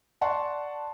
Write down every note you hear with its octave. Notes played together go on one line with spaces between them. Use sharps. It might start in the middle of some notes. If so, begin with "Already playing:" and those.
D5 F#5 A5 C6 C#6